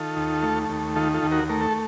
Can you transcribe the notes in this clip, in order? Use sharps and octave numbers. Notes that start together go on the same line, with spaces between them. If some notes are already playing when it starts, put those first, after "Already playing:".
Already playing: D#3 F4 A4
D#2
A3
D#2
D#3 F4 A4
F4 A4
D#2
F#4 A#4
A3 A#4
A4